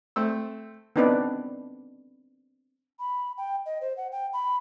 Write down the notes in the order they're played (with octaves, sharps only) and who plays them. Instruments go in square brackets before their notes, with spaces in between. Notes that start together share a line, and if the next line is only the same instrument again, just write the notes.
[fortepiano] A3 C4 E6
[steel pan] B3 C4 D4 D#4 B4 D5
[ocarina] B5
G5
D#5
C5
F#5
G5
B5